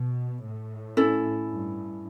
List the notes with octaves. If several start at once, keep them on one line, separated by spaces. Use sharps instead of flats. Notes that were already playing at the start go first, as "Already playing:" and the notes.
Already playing: B2
A2
C#4 E4 A4
G2